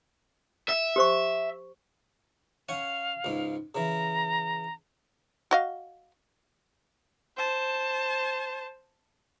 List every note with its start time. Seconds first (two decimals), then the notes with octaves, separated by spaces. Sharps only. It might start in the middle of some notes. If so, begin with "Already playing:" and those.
0.69 E5
0.96 G4 C5 C#6
2.69 C#4 F5 F#5 G#5
3.24 C#2 G#2
3.75 C#3 E3 A#5
5.51 F#4 D#5 F5
7.37 C5 A5